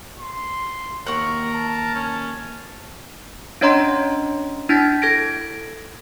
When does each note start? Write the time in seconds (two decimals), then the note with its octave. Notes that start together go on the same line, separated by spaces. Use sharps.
0.20 C6
1.07 D#2 A#4 F#5 C#6
1.53 A5
1.95 C#4
3.61 C#4 D4 C#5 D#5 A#5 C6
4.69 D4 E4 G6 A6 B6
5.02 A4 G#6 A#6 D7